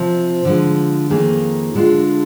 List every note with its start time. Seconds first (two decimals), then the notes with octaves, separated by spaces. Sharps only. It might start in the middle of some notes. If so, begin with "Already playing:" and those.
Already playing: C3 F3 C4
0.45 D3 F3 G#3
1.10 F2 D#3 A#3 D#4 G#4
1.75 D3 G#3 D4 F4